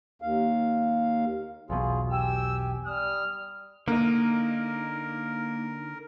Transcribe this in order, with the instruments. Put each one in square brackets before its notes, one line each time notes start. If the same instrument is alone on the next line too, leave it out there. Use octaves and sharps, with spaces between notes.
[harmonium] D#2 F5
[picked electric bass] B1 E2 B2 [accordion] F4 G#4
[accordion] G4 G5 G#5 [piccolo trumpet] E6
[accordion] G3 D#6 [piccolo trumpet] F6
[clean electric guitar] D3 D#4 [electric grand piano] A#3 [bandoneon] A#4